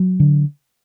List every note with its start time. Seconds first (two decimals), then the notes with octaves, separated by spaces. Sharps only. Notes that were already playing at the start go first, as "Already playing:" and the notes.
Already playing: F#3
0.20 D3